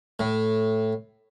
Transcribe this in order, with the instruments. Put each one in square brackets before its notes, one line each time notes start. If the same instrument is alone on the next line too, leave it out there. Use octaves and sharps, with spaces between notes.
[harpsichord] A2